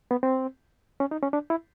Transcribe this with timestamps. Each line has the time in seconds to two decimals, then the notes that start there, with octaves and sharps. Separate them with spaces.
0.11 B3
0.23 C4
1.00 C#4
1.11 D#4
1.22 C#4
1.33 D4
1.50 E4